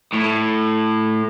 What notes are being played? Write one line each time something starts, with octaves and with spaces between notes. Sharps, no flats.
A2